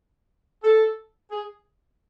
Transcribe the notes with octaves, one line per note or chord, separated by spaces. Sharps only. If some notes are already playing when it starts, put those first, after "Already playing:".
A4
G#4